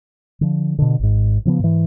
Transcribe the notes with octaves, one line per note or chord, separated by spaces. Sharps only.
D3 F3
B2 D3
G#1 G#2
C#3 F3 A#3 B3
G#2 E3